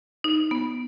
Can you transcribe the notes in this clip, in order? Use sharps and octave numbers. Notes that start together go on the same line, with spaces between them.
D#4
B3